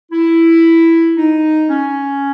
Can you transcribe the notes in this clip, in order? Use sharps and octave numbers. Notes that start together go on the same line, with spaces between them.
E4
D#4
C#4